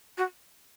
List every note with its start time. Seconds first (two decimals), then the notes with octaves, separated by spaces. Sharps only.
0.18 F#4